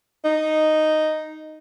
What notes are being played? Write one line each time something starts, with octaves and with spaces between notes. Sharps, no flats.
D#4